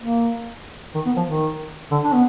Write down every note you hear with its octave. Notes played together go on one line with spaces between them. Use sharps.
A#3
D#3
B3
F3
D#3
D3
D4
B3